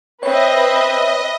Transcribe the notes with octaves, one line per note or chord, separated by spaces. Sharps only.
C4 B4 C#5 D#5 E5